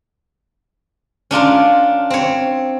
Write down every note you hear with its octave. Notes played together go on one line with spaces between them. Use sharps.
C#4 D4 F4 A#4
C4 C#5